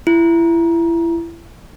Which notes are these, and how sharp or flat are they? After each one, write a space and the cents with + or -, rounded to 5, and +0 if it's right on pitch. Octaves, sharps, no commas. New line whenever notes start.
E4 +25